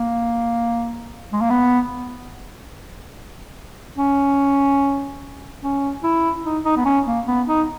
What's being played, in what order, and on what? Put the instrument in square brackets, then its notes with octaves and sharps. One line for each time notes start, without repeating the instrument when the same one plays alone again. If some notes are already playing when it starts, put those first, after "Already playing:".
Already playing: [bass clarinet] A#3
G#3
A#3
B3
C#4
C#4
E4
D#4
D#4
B3
C#4
A#3
B3
D#4